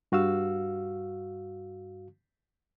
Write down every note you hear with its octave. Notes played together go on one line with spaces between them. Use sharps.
G2 F#4 F5 E6